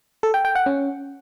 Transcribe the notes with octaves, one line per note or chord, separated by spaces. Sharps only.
A4
G5
G5
F#5
C#4